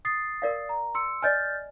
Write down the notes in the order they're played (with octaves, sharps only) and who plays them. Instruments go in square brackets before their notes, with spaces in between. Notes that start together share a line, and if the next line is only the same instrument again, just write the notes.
[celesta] D#6 A6 C7
[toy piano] A#4 D5 F5
[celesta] A#5
C6 E6 C#7
[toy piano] D5 D#5 G#5 [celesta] F6 G6 A6